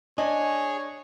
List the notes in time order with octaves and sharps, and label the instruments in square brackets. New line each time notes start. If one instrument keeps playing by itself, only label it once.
[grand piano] D4 [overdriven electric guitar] G#4 [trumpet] C#5 [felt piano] D#5